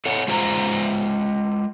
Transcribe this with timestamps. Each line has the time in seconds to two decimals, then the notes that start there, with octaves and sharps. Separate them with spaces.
0.05 A4 C#5 F#5
0.28 G#3 F4 G#4 C5 A#5